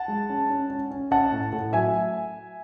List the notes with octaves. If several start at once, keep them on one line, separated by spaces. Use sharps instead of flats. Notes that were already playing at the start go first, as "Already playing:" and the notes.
Already playing: F#5 A5
G#3
C#4
C#4
C#4
C#4
C#4 F#5 A5
A2
A2
F#3 E5 G#5